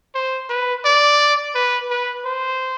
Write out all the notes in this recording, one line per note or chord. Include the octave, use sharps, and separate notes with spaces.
C5
B4
D5
B4
B4
C5